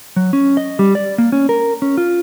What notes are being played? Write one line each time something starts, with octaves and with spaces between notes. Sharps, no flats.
F#3
C#4
D#5
G3
D5
A#3
C#4
A#4
C#4
F4